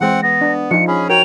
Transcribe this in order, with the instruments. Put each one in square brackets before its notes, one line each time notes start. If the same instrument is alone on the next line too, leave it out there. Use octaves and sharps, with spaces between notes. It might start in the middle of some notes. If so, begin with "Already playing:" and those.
[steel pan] E3 G#3 [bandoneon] C4 F#5
[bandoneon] B3 [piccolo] A#6
[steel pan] D4
[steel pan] F3 D#4 F4 [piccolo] C#7
[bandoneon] C#4 G#4 [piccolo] B5
[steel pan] F#4 A#4 [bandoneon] C#5 G5 [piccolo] F7